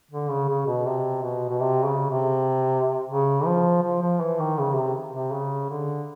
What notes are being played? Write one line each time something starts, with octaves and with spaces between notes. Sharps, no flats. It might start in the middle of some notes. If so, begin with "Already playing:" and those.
D3
C#3
C#3
B2
C3
B2
B2
C3
C#3
C3
C#3
F3
F3
F3
E3
D#3
C#3
C3
C3
C#3
D3